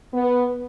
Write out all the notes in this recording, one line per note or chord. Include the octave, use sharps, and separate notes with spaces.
B3